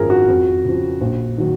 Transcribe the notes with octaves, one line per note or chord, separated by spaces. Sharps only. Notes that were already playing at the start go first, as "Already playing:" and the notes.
Already playing: G#1 F#2 F3 G#4 A#4
F#4
F2
C#3 F3
A#1
D#3 F#3